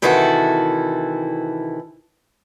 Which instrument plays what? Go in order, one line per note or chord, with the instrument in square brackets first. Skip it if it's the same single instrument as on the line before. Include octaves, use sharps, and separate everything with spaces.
[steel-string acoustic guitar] C3 D#3 E3 E4 F#4 A4